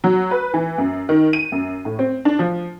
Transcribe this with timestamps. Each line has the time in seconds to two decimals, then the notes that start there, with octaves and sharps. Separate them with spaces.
0.04 F#3
0.31 B4
0.54 E3
0.78 F#2
1.09 D#3
1.33 D#7
1.52 F#2
1.85 A2
1.99 C4
2.25 D4
2.39 F3